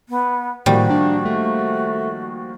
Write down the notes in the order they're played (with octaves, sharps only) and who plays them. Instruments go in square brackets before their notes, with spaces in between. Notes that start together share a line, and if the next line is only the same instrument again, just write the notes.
[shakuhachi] B3
[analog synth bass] A2 [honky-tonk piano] D#3 F3 A#3 [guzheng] G3 [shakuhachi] F#4
[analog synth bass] D4
A3